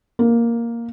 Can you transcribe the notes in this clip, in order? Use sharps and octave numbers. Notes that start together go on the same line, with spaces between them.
A#3